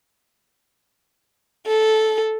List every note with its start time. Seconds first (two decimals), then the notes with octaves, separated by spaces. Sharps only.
1.67 A4